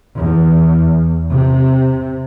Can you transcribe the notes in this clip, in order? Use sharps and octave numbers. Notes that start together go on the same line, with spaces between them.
E2
C3